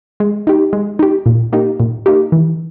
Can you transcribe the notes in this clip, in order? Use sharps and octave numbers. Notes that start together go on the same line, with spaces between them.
G#3
D#4 G4
G#3
D#4 G4
A#2
A#3 D#4 G4
A#2
A#3 D#4 G4
E3